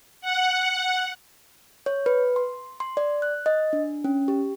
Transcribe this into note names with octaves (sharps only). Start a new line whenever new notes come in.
F#5
C#5
B4
C6
C6
D5
F#6
D#5
D4
C#4
G4